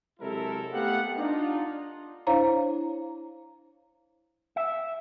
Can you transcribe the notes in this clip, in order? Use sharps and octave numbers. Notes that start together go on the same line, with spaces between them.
C3 F#3 G#3 E4 A4 A#4
A3 B3 G4 F5 F#5
D4 D#4 F4
D4 E4 C5 C#5 F5 A#5
E5